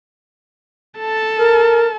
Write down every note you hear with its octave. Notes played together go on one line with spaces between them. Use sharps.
A4 A5
A#4